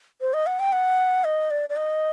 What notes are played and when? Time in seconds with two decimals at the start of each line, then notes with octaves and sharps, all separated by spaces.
0.21 C5
0.34 D#5
0.47 F#5
0.60 G5
0.72 F#5
1.24 D#5
1.51 D5
1.69 D5
1.76 D#5